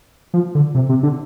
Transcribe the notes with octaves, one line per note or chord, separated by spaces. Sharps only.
F3
D3
C3
C3
D3